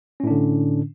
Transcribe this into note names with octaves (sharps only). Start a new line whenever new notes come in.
A2 D3 C#4 D4